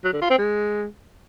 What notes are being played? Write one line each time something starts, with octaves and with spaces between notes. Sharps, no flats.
F#3
D3
F4
C4
G#3